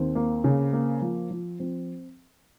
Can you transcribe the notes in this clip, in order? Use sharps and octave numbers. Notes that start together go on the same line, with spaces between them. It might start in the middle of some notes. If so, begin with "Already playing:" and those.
Already playing: D#2 C4
A#3
C#3
A#3
F3
F3
F3 C4